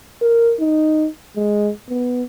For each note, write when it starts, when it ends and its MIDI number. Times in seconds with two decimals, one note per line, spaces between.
0.22 0.55 70
0.60 1.08 63
1.36 1.70 56
1.89 2.23 59